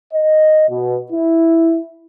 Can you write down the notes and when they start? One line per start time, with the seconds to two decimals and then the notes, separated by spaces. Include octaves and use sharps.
0.14 D#5
0.69 B2
1.12 E4